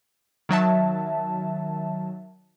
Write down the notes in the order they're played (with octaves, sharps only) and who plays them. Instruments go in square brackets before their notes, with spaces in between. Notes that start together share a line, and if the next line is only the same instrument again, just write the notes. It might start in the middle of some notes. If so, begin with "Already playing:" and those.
[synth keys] D#3 F#3 E5 A5